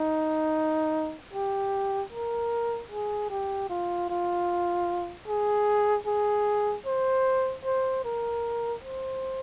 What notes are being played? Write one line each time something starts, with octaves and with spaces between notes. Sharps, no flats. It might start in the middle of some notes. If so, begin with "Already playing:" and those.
Already playing: D#4
G4
A#4
G#4
G4
F4
F4
G#4
G#4
C5
C5
A#4
C5